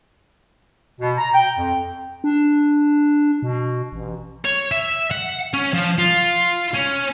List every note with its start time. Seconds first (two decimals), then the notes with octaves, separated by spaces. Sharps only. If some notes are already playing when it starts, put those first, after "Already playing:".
1.00 B2
1.18 A#5
1.34 G5
1.58 F2
2.24 D4
3.42 B2
3.92 A1
4.45 C#5
4.71 E5
5.11 F#5
5.54 C#4
5.74 F3
5.98 F4
6.74 C#4